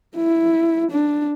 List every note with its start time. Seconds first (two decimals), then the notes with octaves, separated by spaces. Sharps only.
0.17 E4
0.91 D4